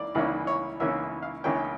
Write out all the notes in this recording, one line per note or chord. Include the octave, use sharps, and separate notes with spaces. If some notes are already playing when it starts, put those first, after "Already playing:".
Already playing: C#2 E3 A#3 D5
C#2 C#3 E3 A#3 C#4 D5
C#5
C#2 C#3 E3 A#3 C#4 E5
F5
C#2 C#3 E3 A#3 C#4 G5